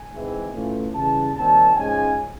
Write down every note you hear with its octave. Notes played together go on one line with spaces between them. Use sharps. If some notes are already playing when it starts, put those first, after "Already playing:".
Already playing: G#5
G#2 E3 G#3 C4 E4
A2 E3 A3 C#4 F4
C#3 E3 G3 A5
D#2 D#3 G3 C4 A5
G#2 F3 G#3 C#4 G#5